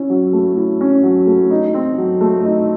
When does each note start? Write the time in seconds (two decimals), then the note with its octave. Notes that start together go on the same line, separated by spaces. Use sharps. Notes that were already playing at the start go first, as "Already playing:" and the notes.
Already playing: C#4 E4
0.10 F#3
0.33 A3
0.57 E4
0.81 C#4
1.04 F#3
1.27 A3
1.51 D#4
1.74 C4
1.98 F#3
2.21 A3
2.44 D#4